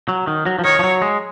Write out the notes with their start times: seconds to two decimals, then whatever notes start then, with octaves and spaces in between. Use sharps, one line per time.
0.09 F#3
0.27 D#3
0.46 F#3
0.59 F3
0.64 D#3 C#5
0.79 F3
0.84 F#3
1.02 G#3